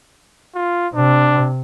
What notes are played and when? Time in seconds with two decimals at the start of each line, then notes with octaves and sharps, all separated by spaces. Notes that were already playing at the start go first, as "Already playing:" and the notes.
0.55 F4
0.94 C3 D4